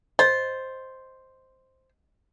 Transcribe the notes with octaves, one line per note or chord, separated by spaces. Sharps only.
C5 D#5